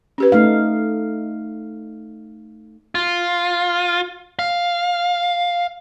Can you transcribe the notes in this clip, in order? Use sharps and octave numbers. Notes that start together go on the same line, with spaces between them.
C#4 G4 B4
A3 D#4 F5
F4
F5